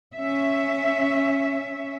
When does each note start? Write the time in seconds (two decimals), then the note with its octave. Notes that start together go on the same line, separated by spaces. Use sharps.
0.15 C#4 E5